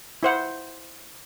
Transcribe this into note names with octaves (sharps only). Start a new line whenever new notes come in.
E4 C5 F#5